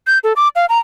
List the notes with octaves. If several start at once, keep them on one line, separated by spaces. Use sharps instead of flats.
G6
A4
D6
F5
A#5